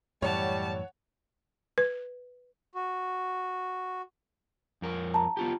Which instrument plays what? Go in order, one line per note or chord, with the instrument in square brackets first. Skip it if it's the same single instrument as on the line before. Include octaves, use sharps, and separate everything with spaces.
[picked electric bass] F#2 A2 E3 [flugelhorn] G3 [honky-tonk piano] C#5 F#5 [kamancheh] A5
[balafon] B4
[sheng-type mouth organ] F#4
[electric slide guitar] F2 A#4
[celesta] A5 A#5
[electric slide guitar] B3 F4 G4